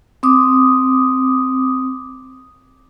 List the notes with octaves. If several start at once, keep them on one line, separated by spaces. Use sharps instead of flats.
C4 D6 D#6